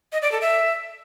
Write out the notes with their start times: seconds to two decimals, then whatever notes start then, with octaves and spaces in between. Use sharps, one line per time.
0.12 D#5
0.22 D5
0.32 A4
0.41 E5